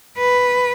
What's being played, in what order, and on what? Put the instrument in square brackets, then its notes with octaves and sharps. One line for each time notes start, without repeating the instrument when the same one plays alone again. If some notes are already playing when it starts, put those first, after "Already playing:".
[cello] B4